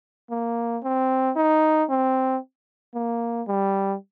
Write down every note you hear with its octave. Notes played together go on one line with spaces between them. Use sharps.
A#3
C4
D#4
C4
A#3
G3